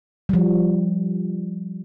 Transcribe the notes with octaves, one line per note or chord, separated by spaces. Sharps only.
F3 G3